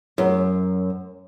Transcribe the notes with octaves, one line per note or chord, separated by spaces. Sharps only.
F#2